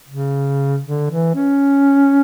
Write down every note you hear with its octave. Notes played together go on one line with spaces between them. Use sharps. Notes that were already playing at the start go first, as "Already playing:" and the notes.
C#3
D3
E3
C#4